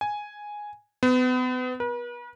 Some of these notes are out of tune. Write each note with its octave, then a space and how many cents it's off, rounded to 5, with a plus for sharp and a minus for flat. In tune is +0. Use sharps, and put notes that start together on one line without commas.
G#5 +0
B3 +35
B4 -45